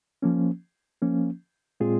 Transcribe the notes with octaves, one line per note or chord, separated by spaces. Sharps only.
F3 A#3 C#4
F3 A#3 C#4
A#2 G#3 C4 F4 G#4